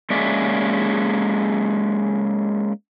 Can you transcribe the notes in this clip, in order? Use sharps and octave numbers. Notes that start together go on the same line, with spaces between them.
G#3 A#3 C#4 G#4 D5 E5